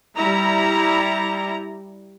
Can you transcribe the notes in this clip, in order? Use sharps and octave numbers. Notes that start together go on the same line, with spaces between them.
G3 E4 A#5